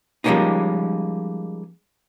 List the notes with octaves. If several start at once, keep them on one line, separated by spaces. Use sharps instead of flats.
F3 G3 G#3 A#3 C#4 D#4